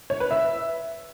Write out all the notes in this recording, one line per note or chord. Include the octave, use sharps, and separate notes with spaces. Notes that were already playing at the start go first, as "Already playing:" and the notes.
C#5
B4
E5